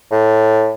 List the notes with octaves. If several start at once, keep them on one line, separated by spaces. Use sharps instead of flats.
A2